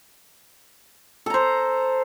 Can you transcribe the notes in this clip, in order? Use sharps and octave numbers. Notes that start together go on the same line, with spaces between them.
A4 C5 A#5